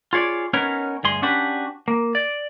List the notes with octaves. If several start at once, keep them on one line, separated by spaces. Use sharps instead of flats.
F4 G#4 C#5 D5
B3 C#4 D#4 A#4 B4 C#5
D2 G2 G#4 C6
C#4 D4 F#4 G4 B4
A#3
D5